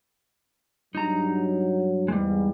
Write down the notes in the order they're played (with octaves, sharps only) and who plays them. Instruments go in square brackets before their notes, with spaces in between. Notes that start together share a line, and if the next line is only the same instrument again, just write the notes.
[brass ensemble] G2 F#3 [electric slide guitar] D#4 A#5
[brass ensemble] E2 G#2 [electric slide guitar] G3 G#3